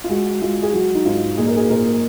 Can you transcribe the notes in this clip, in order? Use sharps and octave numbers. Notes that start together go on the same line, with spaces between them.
F4
G#3 F#4
G#3 F4
G#4
F#3 F#4
D#4
G#2 F4
A#2 G#4
A#4
G#4
A#2 A#4